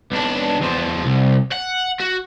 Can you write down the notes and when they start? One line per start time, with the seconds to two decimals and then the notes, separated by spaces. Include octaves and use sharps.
0.12 B1 D4
0.61 E2 F3
1.06 C2
1.52 F#5
2.00 F#4